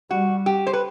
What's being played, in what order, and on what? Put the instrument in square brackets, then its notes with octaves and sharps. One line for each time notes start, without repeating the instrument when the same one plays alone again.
[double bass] G3 [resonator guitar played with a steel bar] F#4
[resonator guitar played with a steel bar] G4
C5
B4